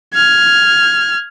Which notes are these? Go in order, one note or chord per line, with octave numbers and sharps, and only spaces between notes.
F6 G#6